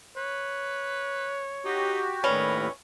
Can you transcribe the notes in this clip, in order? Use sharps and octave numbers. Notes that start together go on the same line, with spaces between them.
B4 C#5
D#4 F#4 G4
D#2 A2 G3 C#4 A#4 B4